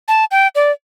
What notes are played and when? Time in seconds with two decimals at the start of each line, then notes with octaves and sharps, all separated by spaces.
0.08 A5
0.31 G5
0.55 D5